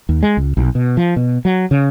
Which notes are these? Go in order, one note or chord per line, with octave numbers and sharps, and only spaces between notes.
D#2
G#3
C#2
B1
B2
F3
B2
F#3
C#3